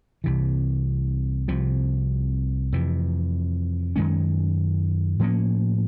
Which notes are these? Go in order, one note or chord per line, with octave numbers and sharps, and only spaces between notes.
C2 C3 E3
C2 C3 F3
F2 C3 E3
F#2 D#3 G#3 C#4
A2 F3 A#3 C#4